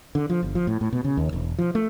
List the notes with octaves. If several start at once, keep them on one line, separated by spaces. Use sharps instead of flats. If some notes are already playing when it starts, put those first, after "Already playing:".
D3
F3
G1
F3
A2
A2
B2
C#3
D#2
E1
F3
A3